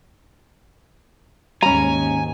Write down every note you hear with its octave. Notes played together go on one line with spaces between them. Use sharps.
D#2 G#2 C#4 G#5 A#5